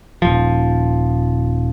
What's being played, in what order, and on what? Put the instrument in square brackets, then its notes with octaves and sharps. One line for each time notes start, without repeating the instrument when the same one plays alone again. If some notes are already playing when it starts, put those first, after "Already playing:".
[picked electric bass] D#1 F3